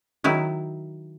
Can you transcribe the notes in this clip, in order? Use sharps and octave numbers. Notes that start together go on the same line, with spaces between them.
D#3 F#3 E4